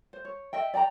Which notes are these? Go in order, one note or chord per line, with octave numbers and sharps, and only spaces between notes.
C5
C#5
D#5 E5 G5
D5 G5 A5 A#5